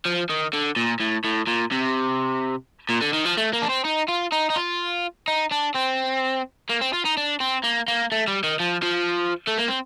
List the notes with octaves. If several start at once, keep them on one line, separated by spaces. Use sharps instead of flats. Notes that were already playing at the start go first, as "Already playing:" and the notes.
F3
D#3
D3
A#2
A2
A2
A#2
C3
A#2
D3
D#3
F3
A3
A#3
D4
C4
D#4
F4
D#4
D#4
F4
D#4
D4
C4
A#3
C4
F4
D#4
D4
C4
A#3
A#3
A3
G3
D#3
F3
F3
A3
A#3
C4